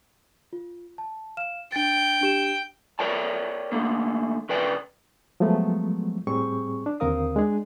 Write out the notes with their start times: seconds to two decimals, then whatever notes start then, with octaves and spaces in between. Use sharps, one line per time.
0.53 F4
0.98 A5
1.37 F5 F6 E7
1.72 D4 G5 A6
2.21 D4 G4 E7
2.99 A#4 C#5 D5 G5 A5
3.72 D3 A3 A#3
4.49 C#3 A#4 B4 D5 G5
5.40 F3 F#3 G#3 A3 B3
6.27 A2 G3 C4 G#4 C#6
6.86 D4
7.00 D#2 D3 C4 A#4 F5 D#6
7.36 G#3 D4 G#4